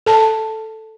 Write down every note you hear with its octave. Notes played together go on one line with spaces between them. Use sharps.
A4 A5